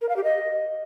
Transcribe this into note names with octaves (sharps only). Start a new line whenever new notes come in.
A#4
F5
G4
D#5